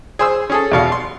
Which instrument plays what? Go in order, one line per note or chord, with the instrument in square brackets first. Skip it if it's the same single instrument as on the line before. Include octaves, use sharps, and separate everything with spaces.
[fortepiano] G#4 C5 E6
C#4 G#4 A4
E2 B2 F5
C6